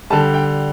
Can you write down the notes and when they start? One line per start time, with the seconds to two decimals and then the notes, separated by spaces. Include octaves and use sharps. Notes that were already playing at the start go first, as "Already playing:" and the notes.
0.10 D3 G3 A5
0.34 G5